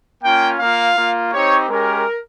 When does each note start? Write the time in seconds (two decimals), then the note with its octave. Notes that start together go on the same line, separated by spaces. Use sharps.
0.24 A#3 C#4 F4 G5
0.60 A#3 F4 F5
0.96 A#3 F4
1.33 C4 D#4 G4 C#5
1.69 G#3 C#4 G4 A#4